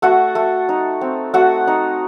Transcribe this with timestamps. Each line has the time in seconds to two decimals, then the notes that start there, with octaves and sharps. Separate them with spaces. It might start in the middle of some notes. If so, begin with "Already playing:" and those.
0.02 A3 F#4 F#5
0.35 A3
0.69 D#4
1.01 C4
1.34 A3 F#4 F#5
1.67 D#4